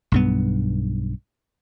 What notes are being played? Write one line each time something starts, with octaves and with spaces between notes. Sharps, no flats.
B1 G2 B3